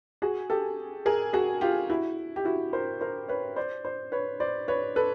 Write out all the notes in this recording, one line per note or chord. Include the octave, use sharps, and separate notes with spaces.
F#4 G#4
G4 A4
G#4 A#4
F#4 G#4
F4 G4
E4 F#4
G4
E4 F#4
A#4 C5
A#4 C5
B4 C#5
C5 D5
C5 D5
B4 C#5
C5 D5
B4 C#5
A4 B4